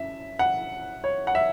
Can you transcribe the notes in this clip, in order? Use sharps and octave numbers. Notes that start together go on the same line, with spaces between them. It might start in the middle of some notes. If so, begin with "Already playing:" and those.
Already playing: F#2 E5
F#5
C#5
F#5
E5